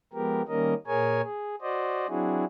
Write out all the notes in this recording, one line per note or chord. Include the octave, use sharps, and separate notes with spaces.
F3 G#3 B3 G4 A#4
D#3 G3 A#3 C#4 A#4 D#5
A#2 G#4 A#4 C#5 G#5
G#4
F#4 C5 D5 D#5
F#3 C4 D4 E4 F#4 G#4